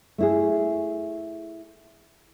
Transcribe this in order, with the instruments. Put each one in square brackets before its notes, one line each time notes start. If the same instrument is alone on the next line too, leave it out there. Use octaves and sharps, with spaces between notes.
[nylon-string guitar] A3 E4 G#4